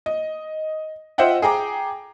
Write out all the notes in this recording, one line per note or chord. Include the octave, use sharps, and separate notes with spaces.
D#5
F4 C5 D#5 E5 F#5 G5
G#4 G5 A#5 D6